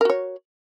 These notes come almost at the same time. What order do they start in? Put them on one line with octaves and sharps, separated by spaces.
A#4 F#4 C#5